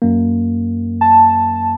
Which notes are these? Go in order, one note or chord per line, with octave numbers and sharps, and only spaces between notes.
F#2 A#3
A5